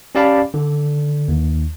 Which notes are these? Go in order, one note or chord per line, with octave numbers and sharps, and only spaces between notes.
C#4 G4 D5 F5 A5 B5
D3
D#2